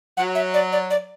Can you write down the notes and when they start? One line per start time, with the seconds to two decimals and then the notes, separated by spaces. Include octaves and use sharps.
0.17 F#3 F#5
0.35 E5
0.54 D5
0.72 D5
0.91 D5